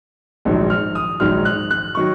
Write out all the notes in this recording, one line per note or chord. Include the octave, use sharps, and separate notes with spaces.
A#1 G#2 D#3 F#3
F6
D#6
A#1 G#2 D#3 F#3 F6
F#6
F#6
D#3 F#3 C#6